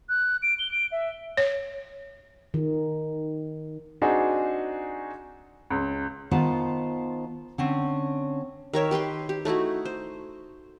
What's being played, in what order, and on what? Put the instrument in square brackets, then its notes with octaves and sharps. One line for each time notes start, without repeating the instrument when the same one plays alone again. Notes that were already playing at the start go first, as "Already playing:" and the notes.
[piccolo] F#6
D7
G7
D7
E5
[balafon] C#5
[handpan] D#3
[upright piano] C4 D4 D#4 F#4 G#4
C#2
[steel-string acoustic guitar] D#3 B3 F4 C5 A5
D3 C4 C#4
[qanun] D#3 A#4 C#5 E5
G4 B4 G5 C6
G4
A3 D#4 E4 F#4
C5